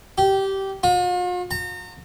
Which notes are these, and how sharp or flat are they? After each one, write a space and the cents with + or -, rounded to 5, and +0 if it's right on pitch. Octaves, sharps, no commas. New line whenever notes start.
G4 -15
F4 +45
A#5 -35